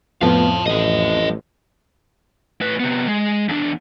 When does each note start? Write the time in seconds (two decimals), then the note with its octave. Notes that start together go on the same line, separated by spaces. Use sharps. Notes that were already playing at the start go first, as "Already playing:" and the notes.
0.21 F2 A2 F3 B3 F5 A5
0.66 A1 A3 D#5
2.61 A2 B4
2.80 C3 B3
3.08 G#3
3.49 E2 D4